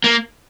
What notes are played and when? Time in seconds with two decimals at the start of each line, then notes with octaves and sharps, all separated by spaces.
0.04 A#3